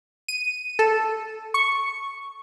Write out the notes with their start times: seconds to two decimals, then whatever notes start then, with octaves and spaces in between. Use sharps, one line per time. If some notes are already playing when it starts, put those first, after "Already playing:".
0.28 D#7
0.79 A4
1.54 C#6